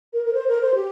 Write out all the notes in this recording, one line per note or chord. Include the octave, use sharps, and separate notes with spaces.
A#4
A#4
C5
A#4
C5
G4